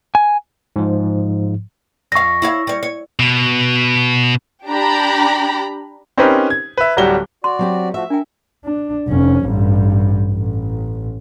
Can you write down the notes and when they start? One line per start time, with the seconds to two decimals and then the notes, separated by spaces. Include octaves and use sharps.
0.15 G#5
0.76 G#2 F3
2.12 F2 F5 C#6 A#6
2.42 E4 C#5 F5
2.67 G3 C#5
2.83 C#5
3.19 B2
4.67 D4 G4 A#5 B5
6.18 C4 C#4 D#4 G4 A#4 B4
6.50 G#6
6.77 B4 E5
6.97 D1 F#3 G3 F#4 G7
7.44 F#4 D5 C6
7.59 F#3 C4 G4
7.94 F3 A3 F#4 E5
8.10 D4 A#4 G5
8.65 D4
9.08 F1 C#4
9.47 A1 G2
10.33 A1